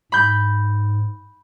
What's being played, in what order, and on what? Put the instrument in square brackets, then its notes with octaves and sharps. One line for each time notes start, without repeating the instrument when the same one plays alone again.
[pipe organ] G#2 [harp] B5 G6